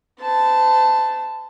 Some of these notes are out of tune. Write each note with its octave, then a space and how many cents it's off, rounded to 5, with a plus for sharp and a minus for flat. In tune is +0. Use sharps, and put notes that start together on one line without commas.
C5 -40 A5 +0